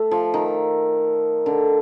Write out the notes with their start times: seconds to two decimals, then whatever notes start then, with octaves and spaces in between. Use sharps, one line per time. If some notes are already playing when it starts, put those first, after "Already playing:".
Already playing: A3
0.11 F3
0.34 D#3
1.46 D3